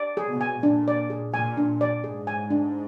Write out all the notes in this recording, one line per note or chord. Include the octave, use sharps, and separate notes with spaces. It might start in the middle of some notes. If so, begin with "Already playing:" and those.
Already playing: D5
G#4
B2
G#5
A#2 D4
D5
G#4
A#2 G#5
D4
D5
G#2 G#4
G#5
D4